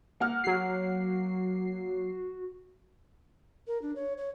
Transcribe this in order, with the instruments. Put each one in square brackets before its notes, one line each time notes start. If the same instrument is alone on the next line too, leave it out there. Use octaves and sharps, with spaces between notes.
[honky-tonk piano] A#3 F#5 F6
[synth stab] F#3 C7 [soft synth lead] F#4
[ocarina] A#4
D4
C#5
C#5